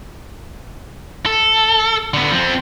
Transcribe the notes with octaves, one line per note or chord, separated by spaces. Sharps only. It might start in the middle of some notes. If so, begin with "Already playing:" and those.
A4
D3 B3
F3 C4